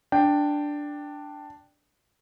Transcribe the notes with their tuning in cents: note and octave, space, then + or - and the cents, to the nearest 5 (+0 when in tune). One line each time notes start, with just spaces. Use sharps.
D4 +0 G5 +0